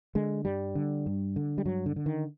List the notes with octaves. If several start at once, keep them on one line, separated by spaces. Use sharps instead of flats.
D3 G#3
G2 G3
D3
G2
D3
G3
G2 F#3
D3
D3
D#3